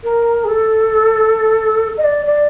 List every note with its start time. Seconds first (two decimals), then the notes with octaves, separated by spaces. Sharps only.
0.03 A#4
0.44 G#4
0.48 A4
1.97 D#5
2.04 D5
2.26 D5